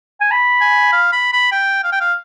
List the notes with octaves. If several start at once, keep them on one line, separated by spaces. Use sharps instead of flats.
G#5
B5
G#5
F5
B5
B5
G5
F5
G5
F5